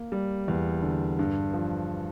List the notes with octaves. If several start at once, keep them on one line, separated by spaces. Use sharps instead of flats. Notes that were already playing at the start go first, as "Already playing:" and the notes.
Already playing: A#3
G3
E2
D3
G2
F3